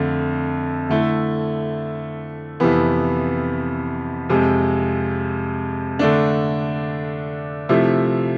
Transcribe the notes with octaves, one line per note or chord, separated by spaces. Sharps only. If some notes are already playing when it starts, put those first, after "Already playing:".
Already playing: F2 D3 A3
D3 A3 E4
F2 C3 E3 B3
F2 C3 G#3
D3 A3 D4
C3 F3 A3 E4